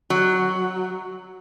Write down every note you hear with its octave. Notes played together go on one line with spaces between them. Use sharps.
F#3